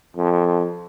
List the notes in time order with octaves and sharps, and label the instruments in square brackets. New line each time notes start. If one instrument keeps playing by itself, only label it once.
[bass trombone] F2